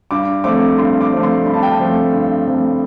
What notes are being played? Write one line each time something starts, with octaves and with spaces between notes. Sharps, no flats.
G2 D6
F3 A3 C4 D6
G2 C6
D6
F3 A3 C4
C6
G2 B5
A5
G5
A5
F3 A3 C4
G2
F3 A3 C4